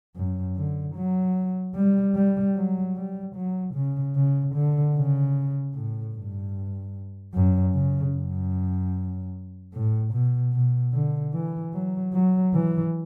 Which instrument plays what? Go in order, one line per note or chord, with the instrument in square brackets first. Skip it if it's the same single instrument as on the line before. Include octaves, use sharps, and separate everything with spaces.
[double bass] F#2
D3
F#3
G3
G3
F#3
G3
F#3
C#3
C#3
D3
C#3
A2
G2
F#2
C#3
F#2
A2
B2
B2
D3
E3
F#3
F#3
E3